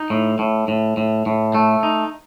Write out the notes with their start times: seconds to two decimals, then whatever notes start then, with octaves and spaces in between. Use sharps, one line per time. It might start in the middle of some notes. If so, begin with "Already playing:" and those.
Already playing: D#4
0.10 A2
0.39 A2
0.68 A2
0.97 A2
1.26 A2
1.55 A3
1.83 D#4